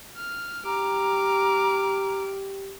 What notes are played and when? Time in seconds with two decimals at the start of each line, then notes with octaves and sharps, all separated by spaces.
0.17 F6
0.66 G4 A#5 D6 F6